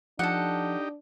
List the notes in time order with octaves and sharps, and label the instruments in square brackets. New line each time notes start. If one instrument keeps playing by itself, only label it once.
[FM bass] F3 [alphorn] D4 [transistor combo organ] D#4 G4 [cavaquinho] A4 F#5